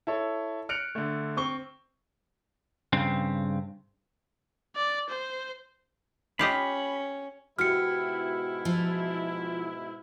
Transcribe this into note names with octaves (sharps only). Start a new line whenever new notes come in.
E4 A4 C#5
F6 F#6 C#7 D7 F7
D3 A3
C4 C#6 G7
G2 C#3 C4
D5
C5
C#4 F4 G4 D#5 B5
G#2 B2 B3 E4 F#4 G4 F6 C#7
F3 F4